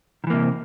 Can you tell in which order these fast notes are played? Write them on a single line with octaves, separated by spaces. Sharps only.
D#3 E3 A#3 C3